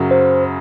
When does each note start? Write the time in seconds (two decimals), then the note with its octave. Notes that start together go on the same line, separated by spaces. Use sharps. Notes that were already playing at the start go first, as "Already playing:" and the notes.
Already playing: F#2 C#3 F#3
0.11 C5